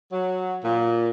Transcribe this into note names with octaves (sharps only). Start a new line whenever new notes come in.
F#3
A#2